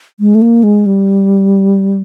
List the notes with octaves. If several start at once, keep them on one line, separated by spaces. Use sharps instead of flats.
G#3
A3
A#3
G#3
G3